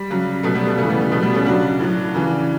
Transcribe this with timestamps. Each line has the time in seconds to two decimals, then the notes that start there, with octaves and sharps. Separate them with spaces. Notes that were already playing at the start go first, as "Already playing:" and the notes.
Already playing: G3
0.10 C#3 F#3
0.43 B2 F#3 A3
0.55 G3 B3
0.67 A3
0.77 C#3 A3
0.83 E3
0.90 G3 B3
1.01 A3
1.11 B2 F#3 A3
1.23 G3 B3
1.34 A3 C#4
1.45 C#3 F#3 D4 F#4
1.80 A2 F#3
2.14 C#3 E3